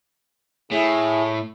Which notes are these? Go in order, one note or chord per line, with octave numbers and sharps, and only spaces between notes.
A2 E4 G#4